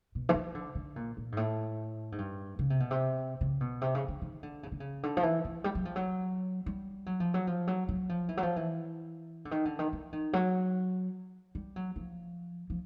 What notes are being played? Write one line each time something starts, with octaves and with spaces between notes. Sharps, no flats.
B2
E3
F3
D3
D3
A#2
A#2
G#2
A2
G#2
G2
C#3
C3
B2
C3
C#3
B2
C3
C#3
D3
D#3
D3
C#3
D3
C#3
D3
F3
E3
F3
G3
F#3
F3
F#3
G3
F#3
F3
F#3
F3
F#3
F#3
F3
E3
F#3
F3
E3
D3
D#3
D3
D#3
E3
D#3
F#3
G3
F#3
F3
F3